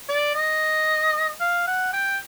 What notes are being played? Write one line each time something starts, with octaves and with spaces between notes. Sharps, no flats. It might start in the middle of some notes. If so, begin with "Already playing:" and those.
D5
D#5
F5
F#5
G5